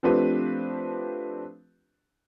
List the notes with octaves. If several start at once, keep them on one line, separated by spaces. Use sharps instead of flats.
F3 A3 C4 D4 G4 B4